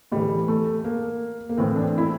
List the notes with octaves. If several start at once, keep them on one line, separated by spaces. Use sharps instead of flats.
A2 E3 G3
A3
A#3
A#3
A2 E3 C4
D4
C4
E4